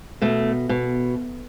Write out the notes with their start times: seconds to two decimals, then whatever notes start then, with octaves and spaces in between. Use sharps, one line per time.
0.21 B2 A3
0.69 B2